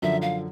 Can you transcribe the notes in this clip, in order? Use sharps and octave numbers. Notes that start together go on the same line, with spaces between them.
F#2 D3 F3 E5
F5